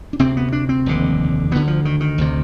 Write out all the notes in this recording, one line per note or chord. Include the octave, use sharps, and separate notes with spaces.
D4
D2 C3 C4
B3
D4
C4
F1 D#2 D3
D2 D3 B3
F3
D#3
D#3
D2 C3